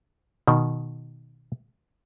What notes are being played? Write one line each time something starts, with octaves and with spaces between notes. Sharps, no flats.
B2 D#3